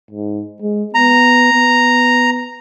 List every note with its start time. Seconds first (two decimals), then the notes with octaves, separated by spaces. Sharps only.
0.11 G#2
0.62 G#3
0.95 B3 A#5
1.53 B3